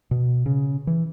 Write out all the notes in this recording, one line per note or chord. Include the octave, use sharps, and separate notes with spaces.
B2
C#3
E3